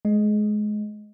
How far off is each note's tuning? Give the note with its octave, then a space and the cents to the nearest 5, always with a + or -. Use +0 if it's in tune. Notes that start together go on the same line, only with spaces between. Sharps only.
G#3 +25 D#5 +0